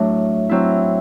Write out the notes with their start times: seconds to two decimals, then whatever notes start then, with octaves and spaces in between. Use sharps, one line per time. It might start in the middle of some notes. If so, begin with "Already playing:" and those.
Already playing: A2 F#3 A3 D4
0.49 F#3 C4 E4